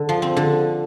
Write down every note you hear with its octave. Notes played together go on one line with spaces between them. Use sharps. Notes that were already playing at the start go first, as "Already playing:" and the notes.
Already playing: D3
F3
C4
D3